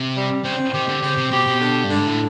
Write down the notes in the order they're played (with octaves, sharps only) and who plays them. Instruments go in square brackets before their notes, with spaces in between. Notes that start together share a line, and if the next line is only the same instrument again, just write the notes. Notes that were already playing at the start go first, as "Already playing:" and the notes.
Already playing: [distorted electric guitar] C3
[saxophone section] G3
[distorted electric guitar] C#3 [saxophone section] C4
[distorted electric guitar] D#3 [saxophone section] G4
[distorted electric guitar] D3
[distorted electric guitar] C#3 [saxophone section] C4
[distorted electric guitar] C3
[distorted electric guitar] B2 [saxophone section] G4
[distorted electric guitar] B2
[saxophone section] D3
[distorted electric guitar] G2
[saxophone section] D3
[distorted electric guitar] G#2
A2